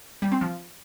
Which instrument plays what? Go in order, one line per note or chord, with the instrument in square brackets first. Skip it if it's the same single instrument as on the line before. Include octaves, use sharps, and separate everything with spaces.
[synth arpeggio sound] G3
C4
F3